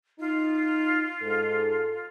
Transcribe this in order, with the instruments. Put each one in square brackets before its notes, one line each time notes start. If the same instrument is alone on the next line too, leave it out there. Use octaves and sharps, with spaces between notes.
[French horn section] D#4 [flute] F4
[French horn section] G#2 [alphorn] A4